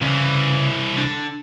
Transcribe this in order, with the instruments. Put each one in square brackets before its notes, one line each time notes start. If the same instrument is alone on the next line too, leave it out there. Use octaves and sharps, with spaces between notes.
[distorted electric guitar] C2 E3 [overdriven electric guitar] C#3
[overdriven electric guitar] D3